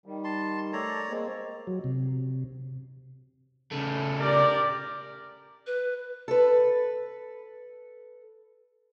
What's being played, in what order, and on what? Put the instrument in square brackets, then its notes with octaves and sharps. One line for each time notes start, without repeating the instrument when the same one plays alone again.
[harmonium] D#3 G3
[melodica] A5 C6
[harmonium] A3 A4 [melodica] C#5 D5 A#5
[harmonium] G#3 A#3 C4
[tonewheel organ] F#3
C3
[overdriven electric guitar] C#3 A3
[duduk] G4 [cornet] A#4 [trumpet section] D5
[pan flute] B4
[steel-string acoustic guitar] A4 B4